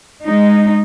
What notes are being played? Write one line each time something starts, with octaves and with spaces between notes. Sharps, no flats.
G#3 D#4